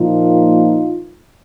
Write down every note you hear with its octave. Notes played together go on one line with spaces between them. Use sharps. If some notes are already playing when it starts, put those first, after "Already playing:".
Already playing: A#2 F3 A#3 D#4 F4